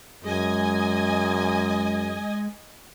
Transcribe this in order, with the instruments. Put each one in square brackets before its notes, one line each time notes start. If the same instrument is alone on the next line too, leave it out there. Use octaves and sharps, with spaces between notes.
[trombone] F#2 [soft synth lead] G#3 [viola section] D#5 G#5